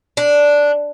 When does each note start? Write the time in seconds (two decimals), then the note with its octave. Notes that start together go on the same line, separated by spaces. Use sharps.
0.17 D4